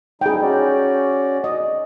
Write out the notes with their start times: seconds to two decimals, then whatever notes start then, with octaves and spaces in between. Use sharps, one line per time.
0.21 G3 D#4 E4 G#4 G5
0.42 C#4 F#4 D5
1.44 D#5